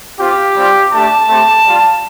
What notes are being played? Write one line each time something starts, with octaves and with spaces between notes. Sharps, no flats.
C4 F4 G4
G3 C4 F4
A3 D4 G4 A5
A3 C4 G4
G3 F4